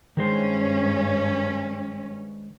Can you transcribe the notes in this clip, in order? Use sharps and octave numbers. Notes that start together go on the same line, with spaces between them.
G2 D#3 G#3 C#4 C5